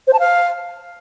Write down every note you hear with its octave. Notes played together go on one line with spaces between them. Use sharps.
C5
A5
F5